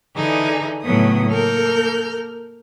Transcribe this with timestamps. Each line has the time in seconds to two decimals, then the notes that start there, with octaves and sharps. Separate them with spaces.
0.15 D3 E3 D#4 G#4
0.83 A2 C#3 F#3 A3 B3 D#6
1.29 A#3 A4 A#4 F6 G6